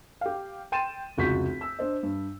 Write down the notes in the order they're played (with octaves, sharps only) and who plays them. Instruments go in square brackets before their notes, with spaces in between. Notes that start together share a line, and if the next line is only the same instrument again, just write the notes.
[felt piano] G4 F5
G5 C6 A6 D#7 E7
F1 C#2 F#4 F#5 G6 B6
E6
D4 C5 D#5
G2